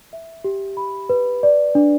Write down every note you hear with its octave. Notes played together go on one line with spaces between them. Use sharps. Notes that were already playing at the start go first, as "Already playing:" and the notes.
E5
G4
B5
B4
D5
D4